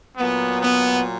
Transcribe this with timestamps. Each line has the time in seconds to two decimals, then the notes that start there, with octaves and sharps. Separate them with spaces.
0.17 A#2 F#3 B3
0.61 B3